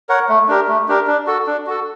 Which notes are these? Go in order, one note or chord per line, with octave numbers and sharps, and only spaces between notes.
A#4 C#5 F#5
A3
D4 G4 A#4
A3
D4 G4 A#4
D4
F#4 A4
D4
F#4 A4